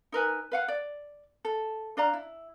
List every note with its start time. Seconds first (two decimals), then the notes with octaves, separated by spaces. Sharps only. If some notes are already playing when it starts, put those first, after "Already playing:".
0.12 D#4 A#4 B4 G#5
0.52 B4 F5 F#5
0.68 D5
1.45 A4
1.97 D4 D5 F5 A#5
2.13 E4